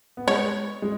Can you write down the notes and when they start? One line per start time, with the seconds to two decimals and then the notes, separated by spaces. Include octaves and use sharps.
0.17 B3
0.27 G#3 C#5
0.82 G#3